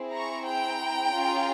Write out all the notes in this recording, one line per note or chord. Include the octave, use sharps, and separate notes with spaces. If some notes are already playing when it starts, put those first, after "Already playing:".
Already playing: C4 E4 G#4
A#5 C#6
G5 A#5
C#4 F4 G#4